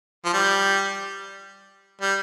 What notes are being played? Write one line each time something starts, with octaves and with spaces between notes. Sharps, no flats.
F3
G3
G3